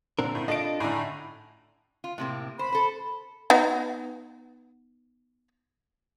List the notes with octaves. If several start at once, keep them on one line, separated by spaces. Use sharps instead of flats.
A#2 D3 C4 A#4
A2
D4 F4 A4 D#5 D7
A2 D3 D4 G#5 A#5
F4
A2 C3 A#3
C5 B5
A4 C5
B3 D#4 F#4